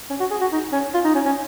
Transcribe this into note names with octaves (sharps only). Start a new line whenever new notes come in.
C#4
F#4
G#4
F#4
D#4
C#4
F4
D#4
C#4
C#4